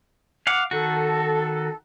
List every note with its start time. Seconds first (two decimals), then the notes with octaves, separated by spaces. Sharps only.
0.47 F5 F#5 D6
0.71 D#3 F#4 A4